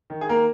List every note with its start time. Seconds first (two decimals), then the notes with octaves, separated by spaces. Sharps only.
0.10 D#3
0.21 G#4
0.29 A#3 A#4